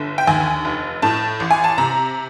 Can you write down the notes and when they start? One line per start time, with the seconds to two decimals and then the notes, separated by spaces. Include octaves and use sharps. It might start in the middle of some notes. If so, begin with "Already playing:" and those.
Already playing: G1 D3
0.18 G5
0.27 D#2 G#5
0.65 F1
1.02 A2 A5
1.40 A1
1.51 G#5
1.64 A5
1.78 C3 A#5